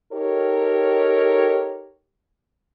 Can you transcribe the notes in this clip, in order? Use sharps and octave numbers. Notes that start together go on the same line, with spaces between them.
D#4 G4 A4 A#4 C#5